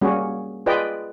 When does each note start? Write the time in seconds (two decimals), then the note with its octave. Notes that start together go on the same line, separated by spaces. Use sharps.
0.01 G3 A#3 C#4 F#4 G#4
0.66 F4 G#4 B4 D5 D#5 G5